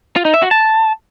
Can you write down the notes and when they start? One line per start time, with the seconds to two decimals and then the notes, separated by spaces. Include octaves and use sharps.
0.16 F4
0.25 D#4
0.34 E5
0.42 F#4
0.51 A5